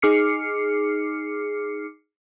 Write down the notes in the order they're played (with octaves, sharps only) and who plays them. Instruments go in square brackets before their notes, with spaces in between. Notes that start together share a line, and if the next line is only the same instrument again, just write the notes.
[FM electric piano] D#4 G#4 D6 F6 C7 C#7